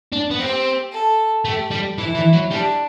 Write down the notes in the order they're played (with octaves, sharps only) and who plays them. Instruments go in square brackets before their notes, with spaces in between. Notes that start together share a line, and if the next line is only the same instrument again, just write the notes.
[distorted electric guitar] D4
B3
[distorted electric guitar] C4 [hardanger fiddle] G4
[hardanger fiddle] A4
[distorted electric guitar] A3 [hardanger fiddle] G4
[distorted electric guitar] G3
[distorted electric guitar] E3 [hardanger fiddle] E4
[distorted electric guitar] E3
F#3
[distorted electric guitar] G3 [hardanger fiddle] D4